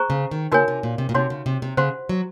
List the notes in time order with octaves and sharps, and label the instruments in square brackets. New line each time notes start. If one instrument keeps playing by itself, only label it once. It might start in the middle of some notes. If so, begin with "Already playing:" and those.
Already playing: [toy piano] G#4 C5 A#5 C#6
[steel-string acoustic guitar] C#3
D#3
[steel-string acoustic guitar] C#3 [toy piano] D#4 F#4 A#4 C#5 G#5
[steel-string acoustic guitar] C3
A#2
C3
A#2
[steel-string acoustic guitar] C3 [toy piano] D#4 F#4 C#5 F#5 C6
[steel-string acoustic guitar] C#3
C3
C3
[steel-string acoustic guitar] C#3 [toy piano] C5 F#5 C6
[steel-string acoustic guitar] F#3